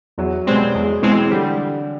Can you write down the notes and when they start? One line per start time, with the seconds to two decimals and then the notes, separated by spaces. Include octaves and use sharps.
0.18 E2 F#3
0.46 B2 G3 G#3 C4
0.74 E2 G#3
1.02 B2 E3 G#3 C4
1.31 D3 G3